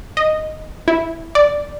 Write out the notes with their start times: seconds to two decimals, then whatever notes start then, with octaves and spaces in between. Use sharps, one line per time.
0.17 D#5
0.88 E4
1.35 D5